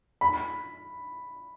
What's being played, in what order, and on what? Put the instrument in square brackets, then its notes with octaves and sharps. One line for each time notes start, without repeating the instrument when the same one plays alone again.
[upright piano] B5